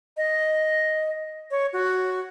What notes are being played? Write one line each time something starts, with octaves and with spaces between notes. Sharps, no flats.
D#5
C#5
F#4